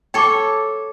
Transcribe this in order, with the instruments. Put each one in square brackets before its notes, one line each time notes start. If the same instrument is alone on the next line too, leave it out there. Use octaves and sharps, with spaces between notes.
[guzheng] A4 C#5 [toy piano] G5 C#6 D6